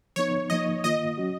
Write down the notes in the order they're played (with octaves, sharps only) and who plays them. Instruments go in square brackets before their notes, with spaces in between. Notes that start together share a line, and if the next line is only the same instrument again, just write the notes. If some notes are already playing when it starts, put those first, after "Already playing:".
[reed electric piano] F3 B3 D#4 [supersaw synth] C#5
[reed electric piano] F3 A#3 D#4 [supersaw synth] D#5
[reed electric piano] D#3 A#3 F4 [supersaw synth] D#5
[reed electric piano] F#3 C#4 F#4